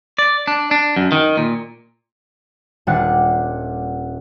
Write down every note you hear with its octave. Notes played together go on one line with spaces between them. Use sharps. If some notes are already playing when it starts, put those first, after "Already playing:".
D5
D4
D4
F#2
D#3
A#2
D#1 G3 D4 F#5 F#6